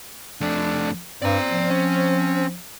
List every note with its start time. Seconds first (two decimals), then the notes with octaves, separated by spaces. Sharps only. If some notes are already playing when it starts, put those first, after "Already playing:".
0.41 F2 A3 D4
1.22 G2 C4 D5 A#5
1.48 F3
1.70 C#4